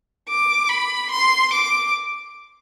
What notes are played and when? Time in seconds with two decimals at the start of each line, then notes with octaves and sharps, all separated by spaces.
0.29 D6
0.69 B5
1.10 C6
1.53 D6